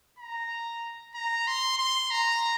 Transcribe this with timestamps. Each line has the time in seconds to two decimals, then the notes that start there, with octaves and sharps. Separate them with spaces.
0.19 A#5
1.15 A#5
1.47 C6
1.78 C6
2.11 A#5